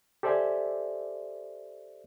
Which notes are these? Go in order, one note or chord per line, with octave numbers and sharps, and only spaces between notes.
G4 A4 C5 D5 E5 G#5